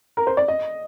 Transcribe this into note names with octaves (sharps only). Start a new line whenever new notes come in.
A#4
C5
D5
D#5